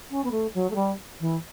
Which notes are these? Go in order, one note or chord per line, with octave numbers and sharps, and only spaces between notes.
C#4
B3
A3
F#3
A3
G3
E3